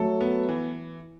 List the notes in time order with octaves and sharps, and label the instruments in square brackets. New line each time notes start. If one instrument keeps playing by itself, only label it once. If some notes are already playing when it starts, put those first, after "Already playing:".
Already playing: [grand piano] F#3 A3 [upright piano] A4
[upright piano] B3
E3